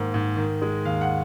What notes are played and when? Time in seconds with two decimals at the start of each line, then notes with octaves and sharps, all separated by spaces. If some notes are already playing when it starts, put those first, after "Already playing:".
Already playing: G#2 D#3 A#3
0.14 G#2
0.37 D#3
0.62 G#3
0.85 D#2 F5
1.01 F#5